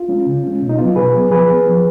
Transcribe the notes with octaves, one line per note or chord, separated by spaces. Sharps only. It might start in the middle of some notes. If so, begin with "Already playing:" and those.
Already playing: F4
G#3 C#4
C#3
G#3 C#4
B2
D#4
F#3 B3 F4
B2 G#4 B4
F#3 B3
F3 G#4 B4
B3
F3